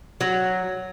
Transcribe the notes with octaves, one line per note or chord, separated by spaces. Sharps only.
F#3